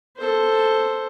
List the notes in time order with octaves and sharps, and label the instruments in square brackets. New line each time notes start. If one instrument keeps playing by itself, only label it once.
[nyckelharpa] A4 C5